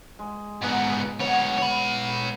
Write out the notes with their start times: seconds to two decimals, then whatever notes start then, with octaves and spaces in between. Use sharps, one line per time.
0.19 G#3
0.62 G#2 B3 D#4 F#5 B5
1.20 D2 B3 C#5 F#5
1.58 C#5 B5